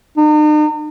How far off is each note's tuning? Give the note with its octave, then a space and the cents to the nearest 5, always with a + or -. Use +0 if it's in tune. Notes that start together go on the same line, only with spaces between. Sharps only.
D#4 -45